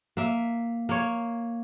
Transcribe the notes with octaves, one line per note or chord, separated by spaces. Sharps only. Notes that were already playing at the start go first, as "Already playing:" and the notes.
A#3 E5
A#3 C#5